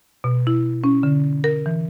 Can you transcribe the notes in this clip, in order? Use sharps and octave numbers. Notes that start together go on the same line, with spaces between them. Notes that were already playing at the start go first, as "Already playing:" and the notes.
B2
E4
C#4
D3
A#4
E3